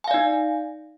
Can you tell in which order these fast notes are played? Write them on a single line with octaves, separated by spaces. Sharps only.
G#5 F5 D5 D#4